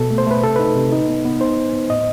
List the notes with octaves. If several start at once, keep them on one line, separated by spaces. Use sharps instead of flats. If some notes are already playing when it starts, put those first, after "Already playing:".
Already playing: B2 A4
A3
C5
A3 B4
C3 A4
D#4 B4
C3
D#4
B3
B3
D#4 C5
B3
B3
A2 D#5